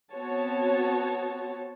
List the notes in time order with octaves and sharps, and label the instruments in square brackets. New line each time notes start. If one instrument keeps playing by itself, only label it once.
[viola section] B3 C4 F#4 C#5 A5